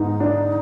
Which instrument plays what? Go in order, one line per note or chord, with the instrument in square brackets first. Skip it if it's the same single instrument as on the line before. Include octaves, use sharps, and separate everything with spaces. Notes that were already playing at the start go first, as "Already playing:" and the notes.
Already playing: [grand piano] G#2 B3 [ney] D#4
[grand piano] D4